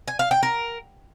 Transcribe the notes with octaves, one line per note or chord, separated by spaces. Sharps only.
G#5
F5
G5
A#4